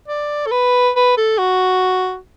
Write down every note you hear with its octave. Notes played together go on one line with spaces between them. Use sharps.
D5
A4
B4
B4
A4
F#4